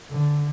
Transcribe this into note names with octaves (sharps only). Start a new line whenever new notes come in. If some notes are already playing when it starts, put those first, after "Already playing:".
D3